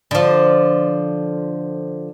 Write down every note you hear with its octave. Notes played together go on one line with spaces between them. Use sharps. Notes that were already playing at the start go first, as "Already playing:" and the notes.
D3 F3